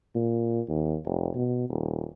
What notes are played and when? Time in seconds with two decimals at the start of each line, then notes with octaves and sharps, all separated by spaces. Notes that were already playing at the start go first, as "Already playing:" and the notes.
0.15 A#2
0.68 D#2
1.05 F1
1.34 B2
1.69 D#1